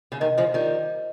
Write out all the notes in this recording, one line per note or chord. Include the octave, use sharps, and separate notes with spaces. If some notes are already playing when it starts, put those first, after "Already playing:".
C#3
C3 D#3 D#5
C#3 F3 C5
D#3 G3 F4